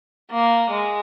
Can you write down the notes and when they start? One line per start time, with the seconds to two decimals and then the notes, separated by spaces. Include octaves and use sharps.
0.30 A#3
0.70 G#3